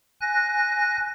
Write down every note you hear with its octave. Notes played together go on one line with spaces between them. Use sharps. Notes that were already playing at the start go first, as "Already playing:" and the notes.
G#5 F#6 A#6